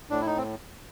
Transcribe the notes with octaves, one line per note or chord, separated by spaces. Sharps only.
A2 D4
E4
D#4
C4